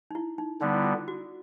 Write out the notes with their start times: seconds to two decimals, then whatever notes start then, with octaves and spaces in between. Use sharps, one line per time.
0.11 D#4
0.15 E4
0.38 D#4
0.61 D3 G3 B3 D#4
0.74 E4
0.85 F4
1.08 F#4